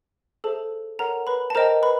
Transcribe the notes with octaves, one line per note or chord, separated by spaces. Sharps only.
G#4 A4 C5 E5 A5
A4 A#4 C#5 F#5 A#5
B4 B5
A5
A#4 C5 D#5 G5 A#5
B4 B5